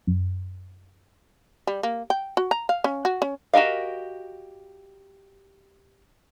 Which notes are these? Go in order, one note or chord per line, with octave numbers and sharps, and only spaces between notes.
F#2
G3
A#3
G5
F#4
A#5
F5
C#4
F#4
C#4
F#4 G4 A#4 D#5 F5